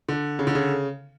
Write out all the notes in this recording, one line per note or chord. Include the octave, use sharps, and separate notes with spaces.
D3
C#3
D3
C#3